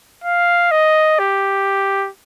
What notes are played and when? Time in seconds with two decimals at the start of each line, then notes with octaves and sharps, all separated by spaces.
0.24 F5
0.71 D#5
1.19 G4